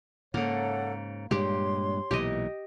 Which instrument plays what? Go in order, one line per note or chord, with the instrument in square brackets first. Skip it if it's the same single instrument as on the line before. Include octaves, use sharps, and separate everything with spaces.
[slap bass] G#2 C#3 [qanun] A#3 [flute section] A4 C#5 F#5
[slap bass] G2 A#2 G#3 [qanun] G4 [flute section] C#5 C6
[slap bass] B1 A#2 E3 [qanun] G4 D#5